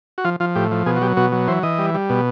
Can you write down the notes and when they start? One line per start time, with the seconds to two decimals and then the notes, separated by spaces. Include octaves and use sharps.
0.18 F#4
0.25 F3 F4
0.40 F3 F4
0.55 A2 G4
0.71 F3
0.86 B2 G#4
0.96 F#4
1.01 F#3 G4
1.17 B2 F#4
1.32 F#3
1.48 E3 C5
1.63 E3 D#5
1.79 G3
1.94 G3
2.10 B2